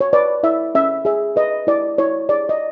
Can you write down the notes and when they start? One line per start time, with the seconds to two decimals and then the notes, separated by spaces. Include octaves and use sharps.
0.01 C#5
0.13 B4 D5
0.43 E4 E5
0.75 C#4 E5
1.05 G#4 E5
1.36 B4 D#5
1.67 E4 D5
1.98 E4 C#5
2.29 G#4 D5
2.49 D#5